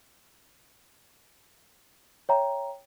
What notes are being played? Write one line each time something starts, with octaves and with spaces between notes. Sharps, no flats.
C#5 E5 G5 A#5